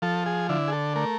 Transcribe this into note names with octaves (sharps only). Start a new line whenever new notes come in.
F3 A4
G#4
D3 E4
G#4
A4
A3 A#4